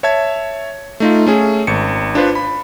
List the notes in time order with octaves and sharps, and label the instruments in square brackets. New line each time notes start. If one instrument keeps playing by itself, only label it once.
[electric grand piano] C#5 E5 A5 G#6
A3 D#4 F4
A3 C#4 G#4
G#1 C#7
D4 F4 B4 C5
B5